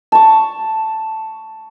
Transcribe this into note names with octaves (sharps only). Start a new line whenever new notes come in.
A5 C#6